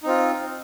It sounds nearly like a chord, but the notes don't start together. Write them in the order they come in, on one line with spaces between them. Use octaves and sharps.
D#4 C4 F4